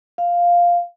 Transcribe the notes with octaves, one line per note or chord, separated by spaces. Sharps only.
F5